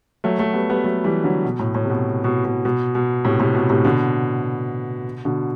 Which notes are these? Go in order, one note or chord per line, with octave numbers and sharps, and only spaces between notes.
F#3 A3
F#3 A3
G3 B3
G3 B3
F#3 A3
E3 G3
D3 F#3
B2
A2
A2
C3
B2
B2
B2
B2
B2
A2 C3
A2 C3
B2
A2 C3
B2 D3
B2 D3